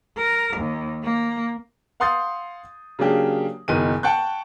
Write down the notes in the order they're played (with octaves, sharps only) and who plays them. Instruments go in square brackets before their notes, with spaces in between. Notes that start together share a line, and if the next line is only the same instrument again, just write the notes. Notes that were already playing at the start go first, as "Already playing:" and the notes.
[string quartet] A#4
D#2
A#3
[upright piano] F5 F#5 C6 D#6 G6 A6
C#3 F#3 A#3 D4 G4
F#1 B2 D#3 D#7
F#5 G5 A5 C#6 F#6 G6